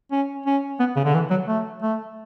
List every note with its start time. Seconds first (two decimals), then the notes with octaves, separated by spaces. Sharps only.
0.11 C#4
0.46 C#4
0.80 B3
0.96 C#3
1.05 D3
1.14 E3
1.31 F#3
1.48 A3
1.82 A3